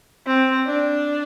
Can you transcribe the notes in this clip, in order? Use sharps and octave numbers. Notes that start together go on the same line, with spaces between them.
C4
D4